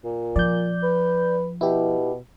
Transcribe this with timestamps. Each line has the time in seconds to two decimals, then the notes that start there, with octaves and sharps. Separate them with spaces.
0.04 A#2
0.36 F3 D5 G6
0.83 B4
1.61 B2 E4 G4